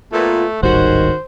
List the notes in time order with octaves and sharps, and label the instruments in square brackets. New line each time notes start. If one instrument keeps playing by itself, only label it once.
[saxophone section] A#2 B3 [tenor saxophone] A3 [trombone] F4
[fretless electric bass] D1 G#1 G3 [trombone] D#3 [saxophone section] G#3 C#4 F#4 [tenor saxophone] C5